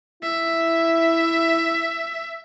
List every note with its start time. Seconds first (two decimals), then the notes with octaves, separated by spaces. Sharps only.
0.23 E4 E5